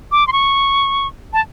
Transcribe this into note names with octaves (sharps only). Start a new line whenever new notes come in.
D6
C6
C#6
A5